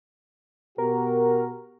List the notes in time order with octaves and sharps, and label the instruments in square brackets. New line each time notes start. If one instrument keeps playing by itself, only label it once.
[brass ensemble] B2 F#4 G4 [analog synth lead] A#4